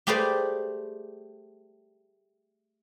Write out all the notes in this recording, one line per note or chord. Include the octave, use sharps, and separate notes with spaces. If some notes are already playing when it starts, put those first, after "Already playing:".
A3 G4 G#4 B4 C5 D5